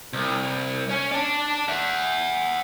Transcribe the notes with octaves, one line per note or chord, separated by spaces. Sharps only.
C2
C#4 C#5
D5 A5
E5 F#5